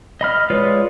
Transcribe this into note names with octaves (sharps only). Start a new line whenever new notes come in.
D#5 B5 F6
G#3 F4 B4 C#5 D5